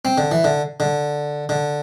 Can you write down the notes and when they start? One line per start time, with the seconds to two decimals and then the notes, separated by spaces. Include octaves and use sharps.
0.05 C4
0.18 D3
0.32 E3
0.44 D3
0.80 D3
1.49 D3